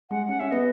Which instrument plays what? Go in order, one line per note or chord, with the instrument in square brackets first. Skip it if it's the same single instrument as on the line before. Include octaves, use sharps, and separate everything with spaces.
[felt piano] G#3 [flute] F#5
[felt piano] C#4 [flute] F#5
[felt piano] C#4 [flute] E5
[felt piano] B3 [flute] D#5